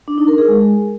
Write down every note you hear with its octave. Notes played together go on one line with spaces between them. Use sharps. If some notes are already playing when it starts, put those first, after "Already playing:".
D4
D#4
A#4
G#4
G#3